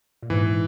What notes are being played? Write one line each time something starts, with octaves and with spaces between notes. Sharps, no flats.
A#2
G#2 E3